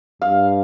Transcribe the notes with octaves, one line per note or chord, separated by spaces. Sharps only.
G2 F5